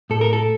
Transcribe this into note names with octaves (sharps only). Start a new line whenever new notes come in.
A2 A4
A#4
A4